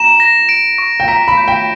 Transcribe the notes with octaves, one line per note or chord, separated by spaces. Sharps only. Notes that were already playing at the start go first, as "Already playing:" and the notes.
Already playing: A#5 E7
A#6
D7
C#6
G5
A#5 B6
B5
G6
G5